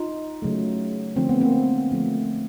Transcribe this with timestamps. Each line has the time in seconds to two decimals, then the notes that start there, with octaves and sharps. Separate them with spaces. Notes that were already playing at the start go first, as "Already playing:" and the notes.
Already playing: D#4 F4
0.42 C#3 F#3 A3
1.16 D3 F3 A3 C4
1.29 B3
1.41 A#3 C4
1.91 D3 F3 A3